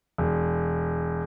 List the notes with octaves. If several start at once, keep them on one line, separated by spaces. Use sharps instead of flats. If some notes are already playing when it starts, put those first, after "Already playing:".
E1